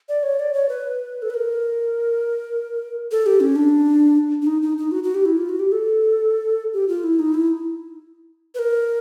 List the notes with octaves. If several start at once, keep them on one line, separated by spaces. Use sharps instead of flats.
D5
C#5
D5
C#5
B4
A4
B4
A#4
A4
G4
C#4
D4
D4
D#4
D#4
D#4
F#4
F#4
G4
E4
F4
F#4
G4
A4
G4
F4
E4
D#4
E4
B4
A#4